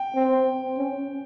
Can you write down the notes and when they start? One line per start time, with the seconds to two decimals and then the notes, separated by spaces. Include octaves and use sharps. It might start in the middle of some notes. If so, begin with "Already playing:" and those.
Already playing: G5
0.16 C4
0.78 C#4